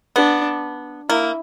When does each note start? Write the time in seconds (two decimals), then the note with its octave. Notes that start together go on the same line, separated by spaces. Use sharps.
0.16 B3 D4
1.10 A#3 E4